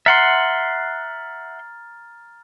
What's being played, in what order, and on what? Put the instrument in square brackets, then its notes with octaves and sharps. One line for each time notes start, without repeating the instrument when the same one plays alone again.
[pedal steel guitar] E5 F#5 C6 [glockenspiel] A#5 F6 A6